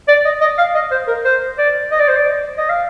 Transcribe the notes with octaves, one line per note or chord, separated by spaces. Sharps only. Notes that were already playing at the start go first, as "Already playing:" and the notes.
D5
D#5
D#5
F5
D#5
C5
A#4
C5
D5
D#5
D5
C5
D5
D#5
F5